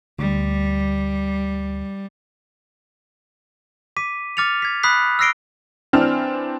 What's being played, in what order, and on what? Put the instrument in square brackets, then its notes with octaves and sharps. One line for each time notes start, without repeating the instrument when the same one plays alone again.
[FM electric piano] D2 [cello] G3
[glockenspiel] D6 B6 D#7
D6 F6 A6 C#7 F7
G#6 B6
B5 D#6 F#6 B6 C7
E6 F6 A#6 C7 D7 G7
[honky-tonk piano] E3 C4 D4 F6